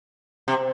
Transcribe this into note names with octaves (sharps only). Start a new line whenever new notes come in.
C3